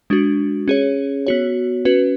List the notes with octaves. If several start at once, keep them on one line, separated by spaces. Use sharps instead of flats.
G#3 D4 F#4
C#4 G#4 C#5
B3 F#4 C#5
C#4 F#4 B4